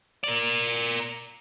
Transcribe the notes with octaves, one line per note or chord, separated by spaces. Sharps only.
A#4 D5